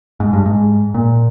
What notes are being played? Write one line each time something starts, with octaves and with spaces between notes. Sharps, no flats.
G#2
G2
G#2
A#2